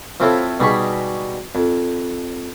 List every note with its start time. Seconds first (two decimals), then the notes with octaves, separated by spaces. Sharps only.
0.20 F3 C4 E4 A4 C#5
0.60 B2 G3 D#4 G#4 B5 C#6
1.55 F2